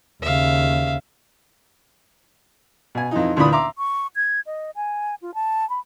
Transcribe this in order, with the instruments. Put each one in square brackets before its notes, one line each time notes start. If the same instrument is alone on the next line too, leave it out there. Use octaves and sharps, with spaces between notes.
[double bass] D#2 C#3 [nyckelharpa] E5 F5
[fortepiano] B2 G#5
F2 E3 D#4
D2 A#2 E3 D4 B5 D#6
E5 A#5 C6 D6
[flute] C#6
G#6
D#5
G#5
F4
A5
B5